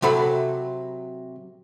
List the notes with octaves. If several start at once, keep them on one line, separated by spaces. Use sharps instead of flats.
C3 F#3 A4 B5